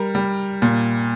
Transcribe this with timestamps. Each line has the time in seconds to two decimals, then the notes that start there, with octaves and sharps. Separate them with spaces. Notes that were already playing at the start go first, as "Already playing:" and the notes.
Already playing: G3 A#4
0.15 G3
0.62 A#2